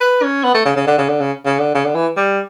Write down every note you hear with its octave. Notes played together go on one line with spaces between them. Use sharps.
B4
C#4
B3
A3
C#3
C#3
D3
C#3
D3
C#3
C#3
D3
C#3
D3
E3
G3